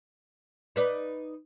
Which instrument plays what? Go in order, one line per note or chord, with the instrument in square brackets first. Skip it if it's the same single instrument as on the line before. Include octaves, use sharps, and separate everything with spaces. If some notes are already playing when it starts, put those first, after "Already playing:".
[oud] D#4 B4 D5